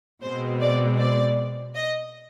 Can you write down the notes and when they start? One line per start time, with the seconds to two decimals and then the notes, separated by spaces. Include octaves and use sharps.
0.22 B2 G#3 C4 C5
0.60 D5
0.99 D5
1.74 D#5